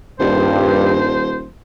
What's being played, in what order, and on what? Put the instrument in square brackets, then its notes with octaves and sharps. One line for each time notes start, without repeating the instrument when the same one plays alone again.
[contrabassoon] D#1 [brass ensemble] G2 [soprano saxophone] C5